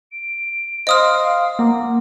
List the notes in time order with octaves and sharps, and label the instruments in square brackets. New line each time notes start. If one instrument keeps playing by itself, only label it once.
[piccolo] D7
[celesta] C5 C6 [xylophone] D#5 D#6 F6 [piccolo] F5
[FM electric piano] A#3 [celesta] F#5 A#5 D6